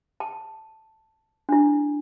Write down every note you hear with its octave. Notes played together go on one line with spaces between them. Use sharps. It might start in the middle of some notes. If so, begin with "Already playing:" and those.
A5
D4 E4